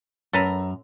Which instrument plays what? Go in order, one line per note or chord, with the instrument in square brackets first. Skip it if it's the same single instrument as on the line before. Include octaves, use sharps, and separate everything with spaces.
[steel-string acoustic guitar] F#2 [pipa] A4 B4 A#5